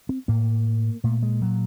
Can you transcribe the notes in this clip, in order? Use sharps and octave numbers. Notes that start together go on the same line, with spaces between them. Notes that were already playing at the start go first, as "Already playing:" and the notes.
C4
A2 A#3
A#2 A3
G#3
F#3